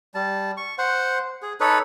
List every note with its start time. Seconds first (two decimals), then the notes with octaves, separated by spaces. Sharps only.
0.14 G3 A5
0.57 C#6
0.78 C5 F#5
1.42 G#4
1.60 D#4 A4 B4 C#5